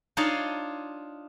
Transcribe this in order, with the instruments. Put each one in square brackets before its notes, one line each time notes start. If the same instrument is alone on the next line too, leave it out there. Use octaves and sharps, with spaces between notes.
[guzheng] D4 D#4 F4 C#5 D#5 F5